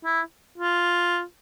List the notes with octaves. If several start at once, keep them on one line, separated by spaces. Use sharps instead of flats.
E4
F4